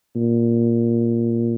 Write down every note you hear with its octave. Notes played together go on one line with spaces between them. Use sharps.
A#2